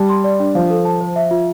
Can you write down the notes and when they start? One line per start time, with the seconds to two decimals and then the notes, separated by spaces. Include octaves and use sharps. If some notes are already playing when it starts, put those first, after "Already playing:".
Already playing: G3 A5
0.09 C6
0.24 D5
0.40 D4
0.55 F3 F5
0.70 A4
0.85 A5
1.01 C5
1.16 E5
1.31 F4